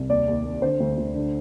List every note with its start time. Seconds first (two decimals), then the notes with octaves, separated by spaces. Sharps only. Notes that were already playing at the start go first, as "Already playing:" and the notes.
Already playing: C2
0.09 D#2 D5
0.28 D#2
0.45 D#2
0.62 D3 C5
0.80 D2
0.97 D2
1.15 D3